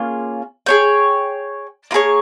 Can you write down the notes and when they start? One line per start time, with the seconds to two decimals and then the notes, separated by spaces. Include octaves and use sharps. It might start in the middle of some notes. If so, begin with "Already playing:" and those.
Already playing: A#3 C#4 F4 G#4
0.66 G#4 C#5 G5
1.91 A#3 F4 G#4 C#5